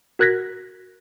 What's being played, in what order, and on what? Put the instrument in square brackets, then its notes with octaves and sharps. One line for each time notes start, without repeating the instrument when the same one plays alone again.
[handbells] F#4 A#4 F#6 G#6 A#6 B6